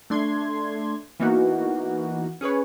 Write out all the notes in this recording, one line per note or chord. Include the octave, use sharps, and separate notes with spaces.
A3 D4 C6 G#6
E3 A#3 B3 D#4 F#4
C#4 G#4 B4 C#5